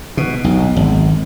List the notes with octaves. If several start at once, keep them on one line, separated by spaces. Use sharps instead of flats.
B2
B1
G#1